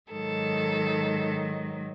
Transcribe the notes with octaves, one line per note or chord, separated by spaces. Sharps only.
G#2 D#3 F#3 A4